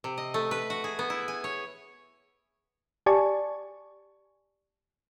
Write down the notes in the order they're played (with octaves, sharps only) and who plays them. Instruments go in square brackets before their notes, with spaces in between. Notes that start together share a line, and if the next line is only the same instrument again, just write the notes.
[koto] C3
D#5
A3
B4
F#4
G#4
B3
E4
G#5
C#5
[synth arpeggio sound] G4 D5 G#5 A5 C#6